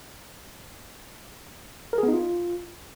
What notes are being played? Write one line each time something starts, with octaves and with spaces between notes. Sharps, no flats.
A#4
G#4
B3
D#4
F4